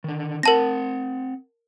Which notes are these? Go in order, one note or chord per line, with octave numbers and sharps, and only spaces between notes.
D3 D#3
C4 A#4 F#5 A5 A#6